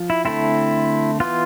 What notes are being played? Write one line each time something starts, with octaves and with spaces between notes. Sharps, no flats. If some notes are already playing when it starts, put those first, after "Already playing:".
Already playing: F3
E4
D3 A3 C4 E4
E3 B3 F4